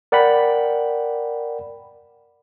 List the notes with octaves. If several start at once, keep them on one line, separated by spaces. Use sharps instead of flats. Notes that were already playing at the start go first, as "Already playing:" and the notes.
A#4 D5 F#5 G5 B5